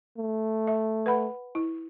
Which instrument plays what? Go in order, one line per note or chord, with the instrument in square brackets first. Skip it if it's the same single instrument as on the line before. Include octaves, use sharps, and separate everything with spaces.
[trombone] A3
[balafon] E5
B4 F#5 B5
E4